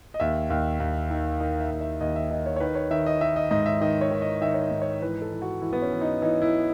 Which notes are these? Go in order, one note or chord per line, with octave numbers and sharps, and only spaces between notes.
D#5
D#2 E5
D#2
D#2
D#3
D#3 D#5
E5
D#2
E5
D#2 D#5
E5
D#3 D#5
C#5
C#5
D#3 B4
C#5
D#3 E5
D#5
D#3 E5
D#5
G#2 D#5
E5
D#3 D#5
C#5
D#3
D#5
D#3 E5
C#5
D#5
G#2
C#5
E3 B4
A4
E3
F#4
E3 E4
B3
C#4
E3
D#4
E3 D#4
E4